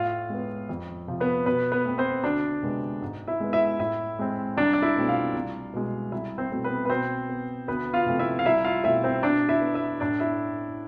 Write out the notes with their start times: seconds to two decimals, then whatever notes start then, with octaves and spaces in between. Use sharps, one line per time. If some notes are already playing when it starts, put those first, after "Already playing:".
Already playing: A2 F4 F5
0.30 G#3 B3
0.69 F2
1.07 C3 F3
1.20 B3 B4
1.46 B2 B3 B4
1.72 B3 B4
1.85 A3 C4
1.98 C4 C5
2.24 D2 D4 D5
2.63 C3 G#3 B3
3.02 G#2
3.28 E4 E5
3.40 G#3 B3
3.53 E4 E5
3.79 A2 E4 E5
4.19 G#3 C4
4.57 C2 D4 D5
4.73 D5
4.82 E4 E5
4.96 B2 A3 C4
5.09 F4 F5
5.35 C2
5.73 B2 G#3
6.12 C2 E4 E5
6.38 C4 C5
6.52 B2 A3 C4
6.64 B3 B4
6.85 B4
6.90 B2 C4 C5
7.29 B3
7.68 D2 B3 B4
7.94 F4 F5
8.06 C3 F3 A3 C4
8.19 E4 E5
8.39 F5
8.46 C2 E4 E5
8.65 F4 F5
8.84 B2 A3 C4 E4 E5
9.04 C4 C5
9.23 B2 D4 D5
9.49 E4 E5
9.61 B3
9.74 E4 E5
10.00 A2 D4 D5
10.20 E4 E5